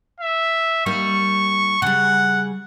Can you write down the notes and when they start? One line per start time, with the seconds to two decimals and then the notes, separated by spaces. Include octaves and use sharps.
0.20 E5
0.86 G3 A#3 D#4 C#6
1.82 C#3 G3 F#5